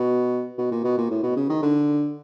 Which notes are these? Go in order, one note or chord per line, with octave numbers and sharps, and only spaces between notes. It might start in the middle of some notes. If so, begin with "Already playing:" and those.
Already playing: B2
B2
A#2
B2
A#2
A2
B2
C#3
D#3
D3